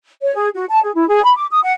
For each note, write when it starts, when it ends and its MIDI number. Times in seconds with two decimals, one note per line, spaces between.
0.22 0.35 73
0.36 0.49 68
0.54 0.64 66
0.70 0.80 81
0.82 0.91 68
0.95 1.06 64
1.08 1.22 68
1.23 1.35 83
1.36 1.45 86
1.51 1.62 87
1.63 1.72 78